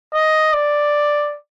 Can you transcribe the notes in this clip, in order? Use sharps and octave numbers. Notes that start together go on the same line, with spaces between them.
D#5
D5